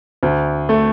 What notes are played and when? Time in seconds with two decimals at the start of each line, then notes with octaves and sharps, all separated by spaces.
0.23 D2
0.69 A3